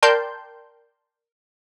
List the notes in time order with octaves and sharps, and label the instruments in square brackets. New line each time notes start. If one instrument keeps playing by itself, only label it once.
[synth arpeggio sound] A#4 D5 G5 A5 C6 G6